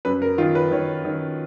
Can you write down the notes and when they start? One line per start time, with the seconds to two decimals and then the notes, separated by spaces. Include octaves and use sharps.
0.05 F#2 B4
0.22 A#4
0.38 D#3 F4
0.55 B4
0.71 D#3 C#5
1.05 D#3